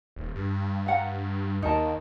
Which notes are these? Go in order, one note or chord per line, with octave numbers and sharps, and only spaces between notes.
D#1
G2
F5 F#5 A#5
D#2 D#4 A#4 A5